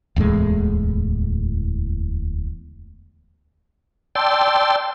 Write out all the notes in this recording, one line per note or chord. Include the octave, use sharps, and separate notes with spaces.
D1 E2 A2 G#3
D5 G5 A5 C6 E6